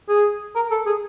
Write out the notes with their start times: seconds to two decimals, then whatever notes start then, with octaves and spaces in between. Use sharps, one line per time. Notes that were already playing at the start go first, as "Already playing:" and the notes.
0.09 G#4
0.56 A#4
0.71 A4
0.86 G#4